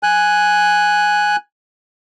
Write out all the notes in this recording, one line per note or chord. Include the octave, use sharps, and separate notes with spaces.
G#5 F#6